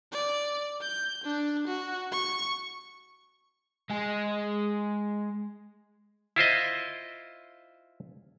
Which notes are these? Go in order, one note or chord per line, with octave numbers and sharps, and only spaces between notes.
D5
G6
D4
F#4
C#6
G#3 G#4
E4 F4 C5 D#5